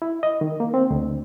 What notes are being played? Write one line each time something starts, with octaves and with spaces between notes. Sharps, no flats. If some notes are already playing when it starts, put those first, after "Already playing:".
E4
D#5
D#3
A#3
C4
D2